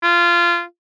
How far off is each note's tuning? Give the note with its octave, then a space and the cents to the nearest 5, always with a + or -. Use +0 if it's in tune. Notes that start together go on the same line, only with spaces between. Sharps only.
F4 -20